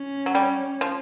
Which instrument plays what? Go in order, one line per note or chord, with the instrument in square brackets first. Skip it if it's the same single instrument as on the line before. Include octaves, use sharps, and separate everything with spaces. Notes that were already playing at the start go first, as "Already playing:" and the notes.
Already playing: [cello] C#4
[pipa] F#3
G3
F3